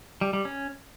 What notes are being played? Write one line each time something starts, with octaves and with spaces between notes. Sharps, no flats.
G3
G3
C#4